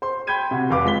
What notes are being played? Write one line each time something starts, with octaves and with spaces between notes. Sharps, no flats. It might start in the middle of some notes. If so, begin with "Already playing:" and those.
C5 C6
G5 B5 G6 G#6 D#7
C3 F#4
F1 B4 F5 D6
G#3 F4 B6 G7